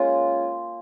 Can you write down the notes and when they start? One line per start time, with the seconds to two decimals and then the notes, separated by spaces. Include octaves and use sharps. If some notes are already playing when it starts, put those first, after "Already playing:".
Already playing: G#3 A#3 C#4 F4